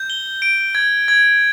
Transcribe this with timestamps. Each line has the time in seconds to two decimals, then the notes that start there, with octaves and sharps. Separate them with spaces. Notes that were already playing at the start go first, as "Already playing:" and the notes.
Already playing: G6
0.10 G7
0.42 D7
0.75 G#6
1.08 G#6